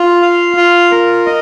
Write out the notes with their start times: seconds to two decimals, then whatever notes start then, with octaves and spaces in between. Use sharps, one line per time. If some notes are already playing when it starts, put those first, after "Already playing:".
Already playing: F4
0.22 F5
0.57 F4
0.91 A#4
1.26 D#5